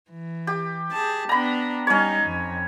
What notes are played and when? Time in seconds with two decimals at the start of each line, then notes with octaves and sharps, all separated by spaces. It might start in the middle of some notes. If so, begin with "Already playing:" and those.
0.11 E3
0.47 G4
0.90 G#4 A5
1.29 B3 D4 A#5 B5
1.87 G3 C#4 D#4 C#5
2.25 F2